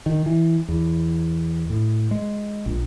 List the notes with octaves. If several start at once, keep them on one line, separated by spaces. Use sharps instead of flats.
D#3
E3
E2
A2
G#3
A#1